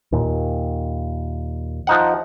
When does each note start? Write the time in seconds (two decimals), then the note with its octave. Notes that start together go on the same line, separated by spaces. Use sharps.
0.12 D#2 A#2
1.87 F3 D#4 F#5